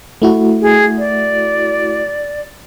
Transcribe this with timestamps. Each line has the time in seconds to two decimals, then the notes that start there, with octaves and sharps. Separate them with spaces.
0.22 A3 E4 F#4
0.62 G#4
0.98 D5